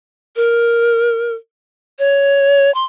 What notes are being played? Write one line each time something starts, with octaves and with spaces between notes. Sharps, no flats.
A#4
C#5
C6